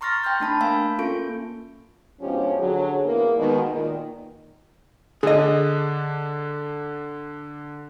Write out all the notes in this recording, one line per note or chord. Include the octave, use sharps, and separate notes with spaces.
A#5 C6 C#6 F6 A6 A#6
G5 C6 F6 G6
A3 D4 A5 B5
A#3 F5 G#5 B5 E6
A#3 C#4 F4 A4 C#6 D7
G#2 B2 F3 C#4 D4 G4
D3 F#3 G#4
E2 A#3
B2 D#3 G#3
A#2 D#3
D3 D4 G#4 D#5